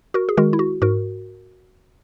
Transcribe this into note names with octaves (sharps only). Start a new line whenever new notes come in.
F#4 A#4
G#4
D#3 G#3 F#4 A#4
E4
F#4
G#2 F#4 A#4